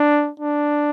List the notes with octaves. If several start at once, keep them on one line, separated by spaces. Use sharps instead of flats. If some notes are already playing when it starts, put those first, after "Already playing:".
Already playing: D4
D4